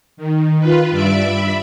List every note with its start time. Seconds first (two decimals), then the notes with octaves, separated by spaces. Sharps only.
0.17 D#3
0.59 F4 B4
0.90 G2 D5 E5 D6
1.20 E5 B5